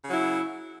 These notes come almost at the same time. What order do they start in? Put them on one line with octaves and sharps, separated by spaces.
C#3 F#3 E4